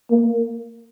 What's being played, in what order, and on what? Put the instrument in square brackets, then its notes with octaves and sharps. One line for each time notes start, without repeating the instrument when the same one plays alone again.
[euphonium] A#3